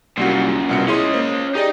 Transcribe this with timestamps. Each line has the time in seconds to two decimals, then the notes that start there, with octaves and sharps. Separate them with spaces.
0.17 C2 F#2 A#2 G3 F#4
0.69 C2 B2 C#7
0.88 C#4 E4 G#4 D#5 C6
1.14 A#3 C5
1.55 D#4 G4 G#4 D5